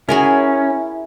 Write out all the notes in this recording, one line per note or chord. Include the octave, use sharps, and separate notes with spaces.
C#4 E4 F#4 G#4 A#4